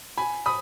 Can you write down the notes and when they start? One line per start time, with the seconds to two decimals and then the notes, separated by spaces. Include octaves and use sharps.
0.18 G#5 B5
0.46 B5 D#6